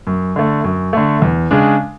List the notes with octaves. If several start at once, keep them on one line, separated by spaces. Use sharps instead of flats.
F#2
D3 A3
F#2
D3 A3
E2
C#3 G#3 D4